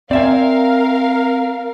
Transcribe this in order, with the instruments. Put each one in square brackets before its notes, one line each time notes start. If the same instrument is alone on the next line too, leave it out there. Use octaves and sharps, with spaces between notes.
[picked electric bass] C4 [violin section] A#4 F5 [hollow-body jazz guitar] D5 E5 G#5